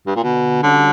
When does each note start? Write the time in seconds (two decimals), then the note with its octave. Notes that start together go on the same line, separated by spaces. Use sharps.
0.07 G2
0.16 A#2
0.23 B2 D3
0.63 D3 G3 C#4 F#4